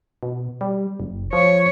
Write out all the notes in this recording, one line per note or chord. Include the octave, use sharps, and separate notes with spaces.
B2
G3
F#1
F3 C#5